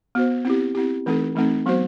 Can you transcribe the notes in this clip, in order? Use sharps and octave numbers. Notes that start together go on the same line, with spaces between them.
B3 F#4 C5
C4 E4 G4
C4 E4 G4
E3 A3 C4 D#4 A4
E3 A3 C4 D#4 A4
F#3 B3 F#4 C5